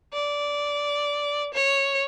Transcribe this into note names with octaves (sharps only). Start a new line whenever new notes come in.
D5
C#5